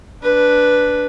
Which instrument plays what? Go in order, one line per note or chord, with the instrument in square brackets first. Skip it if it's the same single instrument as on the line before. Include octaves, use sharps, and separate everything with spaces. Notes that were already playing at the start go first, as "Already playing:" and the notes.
[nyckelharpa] D4 B4